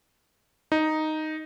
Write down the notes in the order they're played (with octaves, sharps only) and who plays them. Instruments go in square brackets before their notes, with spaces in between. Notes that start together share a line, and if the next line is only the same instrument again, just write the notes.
[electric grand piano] D#4